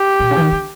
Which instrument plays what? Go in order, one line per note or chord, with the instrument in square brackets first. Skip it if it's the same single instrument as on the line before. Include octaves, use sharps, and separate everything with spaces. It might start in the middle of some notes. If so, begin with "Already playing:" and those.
Already playing: [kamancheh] G4
[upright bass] A#2
C#3
E3
D#3
D3